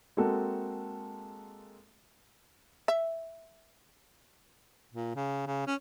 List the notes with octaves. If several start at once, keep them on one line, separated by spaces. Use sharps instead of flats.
G#3 A#3 C4 F#4 A4
E5
A#2
C#3
C#3
C#4